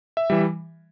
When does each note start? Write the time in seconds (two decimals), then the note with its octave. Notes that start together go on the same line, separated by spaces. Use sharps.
0.17 E5
0.30 E3 G3